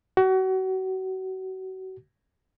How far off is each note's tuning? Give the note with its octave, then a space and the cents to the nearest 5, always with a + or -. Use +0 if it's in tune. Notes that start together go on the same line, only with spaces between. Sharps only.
F#4 +30